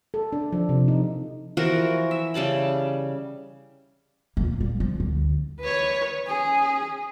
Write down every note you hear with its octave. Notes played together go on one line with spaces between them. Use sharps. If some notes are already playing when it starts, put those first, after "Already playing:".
A4
D4
F3
C3
D#4
E3 F3 F#4 A#4
E5
C#3 G3 A5 B5
A#2 A#3
G3
F3
D2
B4 C#5
C#4 G#4